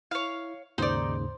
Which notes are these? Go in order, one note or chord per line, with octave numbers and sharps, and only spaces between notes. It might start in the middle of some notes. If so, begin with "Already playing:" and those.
E4 C#5 F5
D#2 G#2 C#3 D#4 C5 D5